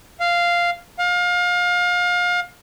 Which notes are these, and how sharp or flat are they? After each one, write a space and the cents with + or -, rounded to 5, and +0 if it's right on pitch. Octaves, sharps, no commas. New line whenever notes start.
F5 -5
F5 +30